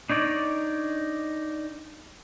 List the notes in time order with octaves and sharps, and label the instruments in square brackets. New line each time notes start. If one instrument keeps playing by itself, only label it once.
[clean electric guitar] D4 D#4 C#5 D5